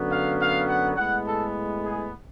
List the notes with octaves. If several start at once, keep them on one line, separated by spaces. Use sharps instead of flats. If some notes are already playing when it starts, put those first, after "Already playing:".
Already playing: F#2 D3 F#3 B3
F5
F5
F#5
A2 G#3 B3 F#5
A4
G#4